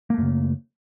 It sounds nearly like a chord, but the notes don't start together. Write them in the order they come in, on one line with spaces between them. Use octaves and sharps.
A#3 A3 F#2 C#3